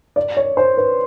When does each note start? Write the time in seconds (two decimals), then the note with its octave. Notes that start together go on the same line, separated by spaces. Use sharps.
0.16 D5
0.37 C#5
0.57 C5
0.77 B4